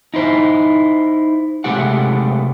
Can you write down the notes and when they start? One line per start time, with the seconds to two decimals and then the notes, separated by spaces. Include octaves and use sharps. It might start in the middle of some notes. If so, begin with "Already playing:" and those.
0.14 D#4 E4 C5
1.64 C3 G#3 A3 G4 F#5